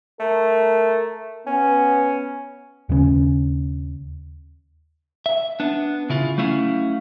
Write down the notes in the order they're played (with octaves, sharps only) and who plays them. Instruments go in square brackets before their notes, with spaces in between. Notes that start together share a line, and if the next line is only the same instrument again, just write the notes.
[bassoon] A3 [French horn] A#4
[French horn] B3 [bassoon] C#4
[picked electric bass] D#2 C#3 G3 C#4
[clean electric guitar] E5
B3 D4
C#3 E4 F4
F#3 A3 C#4 E4 F5